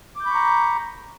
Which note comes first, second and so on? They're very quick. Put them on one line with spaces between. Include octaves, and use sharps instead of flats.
D6 G6 B5 C#6 A#5